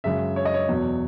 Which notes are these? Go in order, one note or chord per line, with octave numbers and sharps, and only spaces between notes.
F#2 C#3 G#3 E5
C#5
D#5
C#5
E2 B2 F#3